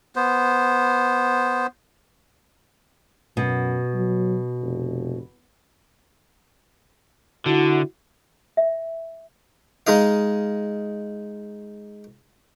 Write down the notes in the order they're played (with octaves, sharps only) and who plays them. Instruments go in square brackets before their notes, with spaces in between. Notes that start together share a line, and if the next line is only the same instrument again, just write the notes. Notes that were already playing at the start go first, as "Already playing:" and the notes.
[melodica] B3 C5
[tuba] F#2 [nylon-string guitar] B2
[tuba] F#3
F1
[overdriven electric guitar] D3 [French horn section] E4 F#4
[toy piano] E5
[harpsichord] G#3 D#4 D#5 F5